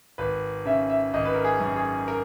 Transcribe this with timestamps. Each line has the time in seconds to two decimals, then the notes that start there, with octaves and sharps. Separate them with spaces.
0.18 G#1 B4
0.66 C#3 E5
0.90 E5
1.13 G#1 D#5
1.25 B4
1.34 A#4
1.44 G#4
1.60 F#2
1.76 G#4
2.08 A#4